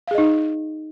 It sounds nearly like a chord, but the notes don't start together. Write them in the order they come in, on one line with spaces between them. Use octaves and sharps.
F5 G#4 D#5 D#4